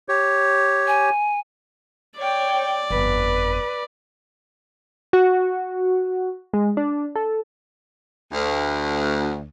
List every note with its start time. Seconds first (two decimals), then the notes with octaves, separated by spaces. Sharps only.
0.09 G4 C#5
0.87 G#5
2.18 C#5 D5 G5
2.90 G1 F2 B4
5.13 F#4
6.53 G#3
6.77 D4
7.15 A4
8.32 D2